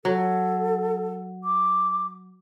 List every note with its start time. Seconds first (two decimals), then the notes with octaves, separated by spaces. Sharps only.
0.05 F#3 A4
1.44 D6